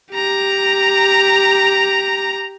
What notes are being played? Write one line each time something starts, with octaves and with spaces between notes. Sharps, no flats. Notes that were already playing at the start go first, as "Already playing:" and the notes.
G4 A#5